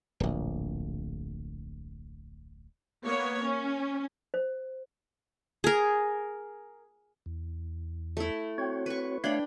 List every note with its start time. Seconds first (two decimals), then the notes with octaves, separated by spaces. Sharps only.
0.20 D1 A#1
3.04 A#3 B3 C#5
3.45 C#4
4.34 C5
5.64 G#4 A#4
7.26 E2
8.17 A3 E4
8.58 C4 F#4 C#5
8.86 B4 C#6
9.24 A3 D4 C#5 F5 G5 B5